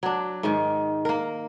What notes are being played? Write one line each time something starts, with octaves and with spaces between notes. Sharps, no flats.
F#3 D4
G#2 D#3
A#3 A#4